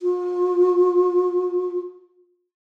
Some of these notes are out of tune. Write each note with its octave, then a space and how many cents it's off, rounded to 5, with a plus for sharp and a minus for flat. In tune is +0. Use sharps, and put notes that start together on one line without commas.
F4 +45